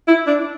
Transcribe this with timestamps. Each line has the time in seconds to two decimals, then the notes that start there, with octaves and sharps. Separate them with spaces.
0.08 E4
0.27 D4